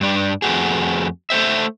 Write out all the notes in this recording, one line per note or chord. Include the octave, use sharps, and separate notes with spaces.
G2 D4
F2 G#2 A3 F#4 G#4
A3 C5 E5